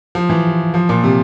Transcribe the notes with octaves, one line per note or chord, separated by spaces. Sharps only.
F3
E3
F3
A#2
C3